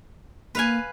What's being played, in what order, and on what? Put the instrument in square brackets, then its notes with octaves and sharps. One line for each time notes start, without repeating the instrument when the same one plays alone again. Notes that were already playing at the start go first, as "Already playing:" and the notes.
[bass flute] A#3 [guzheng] B4 F5 G#5